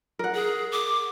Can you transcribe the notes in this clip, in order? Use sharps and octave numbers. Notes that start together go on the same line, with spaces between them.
A#4 F#5
G#4
D6